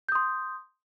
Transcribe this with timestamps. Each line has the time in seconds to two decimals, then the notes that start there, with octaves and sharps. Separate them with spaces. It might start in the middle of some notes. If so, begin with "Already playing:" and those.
0.09 G6
0.12 D#6
0.15 C6